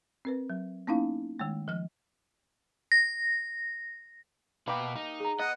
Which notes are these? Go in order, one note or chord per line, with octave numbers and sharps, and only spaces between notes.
C4 A#4 B4
F#3
A#3 B3 C#4 D#4 E4 F5
D#3 G#3 A3
F3 F6
A#6
B2 A#3 G4 B4
D#4
G#4 A#5
B3 D#5 F#5